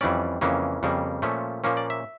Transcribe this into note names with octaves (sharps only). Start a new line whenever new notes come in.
F2 E3 G3 C#4 D5
F2 C#3 E3 A#3 C#4
F2 C#3 G3 A#3
A#2 F3 A3 C#4
A#2 F3 A#3 C#4
D5
E5